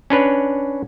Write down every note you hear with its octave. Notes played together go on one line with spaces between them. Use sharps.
C#4 D4 B4 C#5